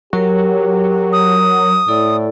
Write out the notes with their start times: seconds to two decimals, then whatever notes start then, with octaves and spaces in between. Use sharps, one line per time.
0.13 F#3 G4 A#4
1.13 D#6
1.88 A2 E4 A4 D5